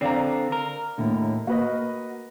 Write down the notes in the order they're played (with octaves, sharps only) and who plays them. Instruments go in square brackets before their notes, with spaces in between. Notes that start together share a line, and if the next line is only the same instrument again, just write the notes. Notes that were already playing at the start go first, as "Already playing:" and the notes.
[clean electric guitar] D3 C4 [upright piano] D5 F5 A#5
[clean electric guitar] A#4
[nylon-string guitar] D#2 A2 D3
[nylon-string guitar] A#3 [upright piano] F#4 B4 D#5